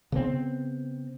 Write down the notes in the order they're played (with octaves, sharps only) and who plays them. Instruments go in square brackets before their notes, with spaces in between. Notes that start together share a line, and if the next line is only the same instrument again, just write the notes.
[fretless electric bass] C#3 B3 C4